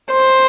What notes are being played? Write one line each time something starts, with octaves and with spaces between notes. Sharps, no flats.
C5